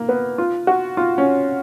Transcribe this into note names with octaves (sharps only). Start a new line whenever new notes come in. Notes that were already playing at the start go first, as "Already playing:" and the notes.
Already playing: A#3
B3
F4
F#4
F4
C#4